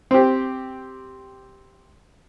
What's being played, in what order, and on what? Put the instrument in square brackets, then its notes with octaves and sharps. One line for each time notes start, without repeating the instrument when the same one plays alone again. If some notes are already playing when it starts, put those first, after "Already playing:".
[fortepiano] C4 G4